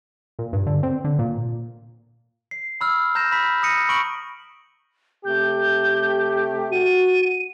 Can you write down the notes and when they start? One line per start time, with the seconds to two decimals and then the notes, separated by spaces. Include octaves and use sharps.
0.39 A#2
0.53 G2
0.67 D3
0.83 C4
1.04 D3
1.19 A#2
2.51 C7
2.81 B5 E6 F6
3.15 A#5 G6 A#6 E7
3.32 B5 B6
3.63 D#6 A#6 C#7 D#7
3.89 B5 C#6 D7 F#7
5.25 C3 A3 G4 G6
6.72 F#4 D#7